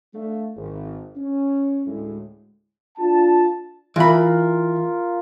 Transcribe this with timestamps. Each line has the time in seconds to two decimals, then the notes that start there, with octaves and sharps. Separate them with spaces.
0.14 A3 D4 F5
0.56 G#1
1.16 C#4
1.87 D2 A2 G#3
2.98 D4 F4 A5
3.96 E3 F4 A#4 B5